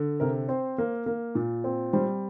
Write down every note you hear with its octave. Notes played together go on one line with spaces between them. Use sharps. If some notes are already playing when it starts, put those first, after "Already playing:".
Already playing: D3
C3 A#4
C4 C5
A#3
A#3
A#2
C4
G3 C5